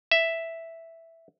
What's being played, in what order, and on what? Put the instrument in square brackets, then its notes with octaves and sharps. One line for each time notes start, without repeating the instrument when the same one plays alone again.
[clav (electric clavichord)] E5